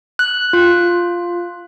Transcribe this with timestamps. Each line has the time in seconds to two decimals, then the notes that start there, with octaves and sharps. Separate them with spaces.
0.19 F#6
0.53 F4